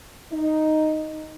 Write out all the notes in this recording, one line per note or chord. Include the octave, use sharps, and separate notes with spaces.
D#4